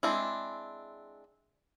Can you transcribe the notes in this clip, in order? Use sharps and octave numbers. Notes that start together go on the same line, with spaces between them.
G#3 C4 D4 E4